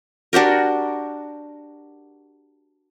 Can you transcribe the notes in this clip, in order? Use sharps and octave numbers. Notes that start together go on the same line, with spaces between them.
D4 F#4 G4 A#4